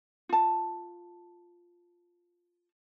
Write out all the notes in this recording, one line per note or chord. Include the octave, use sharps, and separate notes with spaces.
F4 A5